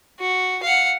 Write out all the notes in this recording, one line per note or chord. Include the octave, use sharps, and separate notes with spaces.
F#4
F5 F#5